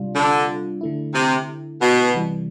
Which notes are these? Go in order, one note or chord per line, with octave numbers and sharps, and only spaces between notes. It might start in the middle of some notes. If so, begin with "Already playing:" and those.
Already playing: C3 G3 D4 F4
D3
D3 A3 E4
C3
B2
C3 E3 G3